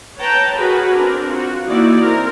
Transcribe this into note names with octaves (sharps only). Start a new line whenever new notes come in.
B4 C#5 G5 A5 A#5
F#4 G#4 A#4 B4 G#5
C4 D4 A#4
F4 F#4
E3 A#3 D#4 E4 F#4 D5
C4 A#4